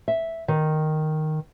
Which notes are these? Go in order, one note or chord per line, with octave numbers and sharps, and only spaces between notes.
E5
D#3